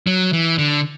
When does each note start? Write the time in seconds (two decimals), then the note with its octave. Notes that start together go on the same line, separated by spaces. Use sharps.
0.07 F#3
0.33 E3
0.58 D3